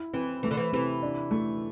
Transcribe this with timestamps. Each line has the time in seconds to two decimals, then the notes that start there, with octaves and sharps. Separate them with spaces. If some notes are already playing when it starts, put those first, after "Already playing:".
Already playing: E4
0.14 E3 C4
0.43 E3 A3
0.51 D3
0.57 E3
0.72 C3 E3
1.02 D4
1.31 A3